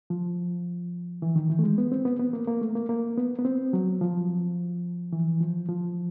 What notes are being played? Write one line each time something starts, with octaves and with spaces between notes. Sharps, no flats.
F3
E3
D#3
E3
A3
G#3
B3
C4
B3
B3
A#3
A#3
A3
A#3
A#3
B3
B3
C4
F#3
F3
E3
F3
F3